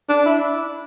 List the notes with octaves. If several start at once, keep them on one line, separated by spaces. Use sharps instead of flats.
D4
E4